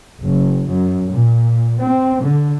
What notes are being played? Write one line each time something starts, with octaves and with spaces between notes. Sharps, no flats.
F#1
F#2
A#2
C4
D3